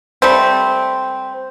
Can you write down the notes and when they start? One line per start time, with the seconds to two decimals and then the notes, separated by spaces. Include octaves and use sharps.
0.22 G3 A3 C4